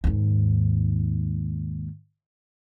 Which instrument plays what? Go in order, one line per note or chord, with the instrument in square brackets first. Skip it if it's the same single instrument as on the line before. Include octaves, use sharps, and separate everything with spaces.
[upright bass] D#2 G#2